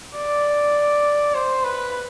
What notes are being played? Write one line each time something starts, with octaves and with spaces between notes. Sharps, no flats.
D5
C5
B4